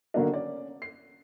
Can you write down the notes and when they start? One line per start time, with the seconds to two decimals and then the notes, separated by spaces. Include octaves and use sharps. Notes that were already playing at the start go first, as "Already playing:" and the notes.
0.14 D3 D#3 F#3 A#3 B3 D4
0.33 C#4 D5
0.82 C7